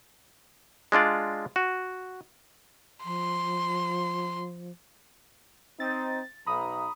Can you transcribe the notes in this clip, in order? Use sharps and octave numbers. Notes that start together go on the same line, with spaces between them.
G#3 D4 F4 D5
F#4
F3 C6
C4 D#4 A6
B1 A#5 B5 D#6